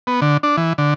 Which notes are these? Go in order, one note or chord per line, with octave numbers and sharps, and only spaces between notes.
B3
D3
D4
E3
D3